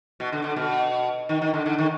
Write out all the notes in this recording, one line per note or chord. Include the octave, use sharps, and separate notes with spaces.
B2
D3
D3
B2
D#3
D#3
D3
D3
D#3